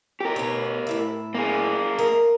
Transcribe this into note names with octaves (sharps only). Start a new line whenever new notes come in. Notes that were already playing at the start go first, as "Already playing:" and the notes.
G4 A#4
B2 C#5
A2 E4 E5
A#3 G#4
A#4 D#5